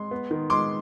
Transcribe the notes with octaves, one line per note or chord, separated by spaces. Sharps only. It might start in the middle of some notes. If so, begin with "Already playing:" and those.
Already playing: G#3 C6
B3
D#3
G#3 C6 D6